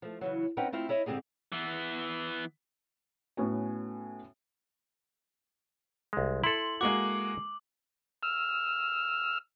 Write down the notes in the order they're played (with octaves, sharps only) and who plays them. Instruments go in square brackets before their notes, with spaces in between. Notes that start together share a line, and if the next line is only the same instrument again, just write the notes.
[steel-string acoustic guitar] F3 A3
C#3 E3 F#3
C4 C#4 D#4 B4 F#5 G5
A3 C4 E4 F4
E4 C#5 D#5 E5
G#2 D3 C4 D#4 G4 G#4
[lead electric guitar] E3 B3
[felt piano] A2 B3 C#4 F#4 G#5
[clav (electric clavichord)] C2 G#3
[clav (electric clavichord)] E4 A4 [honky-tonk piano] C6 [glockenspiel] F#7
[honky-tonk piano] G#3 A#3 F#4 [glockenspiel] D6 F#7
[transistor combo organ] E6 F6